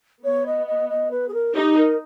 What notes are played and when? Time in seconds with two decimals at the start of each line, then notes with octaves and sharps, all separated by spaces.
0.24 B3 C#5
0.46 D#5
0.67 D#5
0.89 D#5
1.11 B4
1.28 G#4
1.33 A#4
1.55 D#4 G4
1.77 A#4